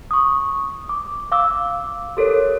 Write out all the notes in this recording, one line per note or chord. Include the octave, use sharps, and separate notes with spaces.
C#6 D#6
D6
F5 D6 E6
G4 A4 A#4 C#5